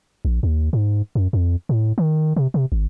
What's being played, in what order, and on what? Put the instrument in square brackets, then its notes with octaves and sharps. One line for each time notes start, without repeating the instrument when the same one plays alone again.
[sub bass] A#1
D#2
G#2
F#2
F2
A2
D#3
C3
C3
G#1